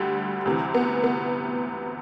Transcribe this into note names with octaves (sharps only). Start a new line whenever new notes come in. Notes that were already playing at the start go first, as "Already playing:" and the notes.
Already playing: D2 D3 G3
D2 C3 E3
B3
B3